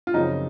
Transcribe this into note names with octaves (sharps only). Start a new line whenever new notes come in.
F4
F#2 C#3 F3 C4 D#4